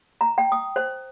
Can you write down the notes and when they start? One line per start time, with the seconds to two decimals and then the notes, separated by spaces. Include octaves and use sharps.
0.21 A#5
0.38 G5
0.52 D#6
0.76 C5